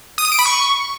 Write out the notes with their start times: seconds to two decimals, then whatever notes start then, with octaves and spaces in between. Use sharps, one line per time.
0.18 D#6
0.25 D#7
0.32 D7
0.39 B5
0.45 C#6